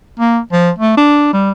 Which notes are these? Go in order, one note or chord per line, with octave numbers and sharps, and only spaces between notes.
A#3
F3
A3
D4
G3